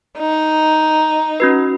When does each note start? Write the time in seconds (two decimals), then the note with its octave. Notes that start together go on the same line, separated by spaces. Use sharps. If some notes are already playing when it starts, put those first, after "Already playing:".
0.18 D#4
1.40 C#4 F#4 B4